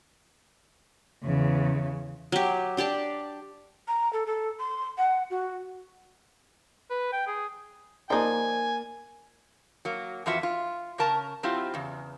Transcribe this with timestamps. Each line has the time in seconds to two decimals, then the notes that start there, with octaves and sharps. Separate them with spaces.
1.23 E2 C#3
2.32 F#3 G4
2.77 D4 G4 D5 A5
3.88 A#5
4.13 A4
4.26 A4
4.59 C6
4.98 F#5
5.30 F#4
6.90 B4
7.13 G5
7.27 G#4
8.10 F3 A#3 D#4 D5 G#5
9.85 F#3 A#3
10.26 F2 E3 F4 F#4 E5
10.43 F4
10.98 C#3 C#4 A#4 A5 A#5
11.43 F#3 C4 E4 F4 G4
11.74 E2 C#3